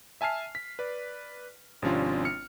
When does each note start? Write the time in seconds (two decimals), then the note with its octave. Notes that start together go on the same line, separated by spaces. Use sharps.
0.21 E5 G#5 A5 F6 C7
0.55 B6
0.79 B4 D5
1.82 G#1 C3 F3 C#4 D4 F4
2.25 F6 C#7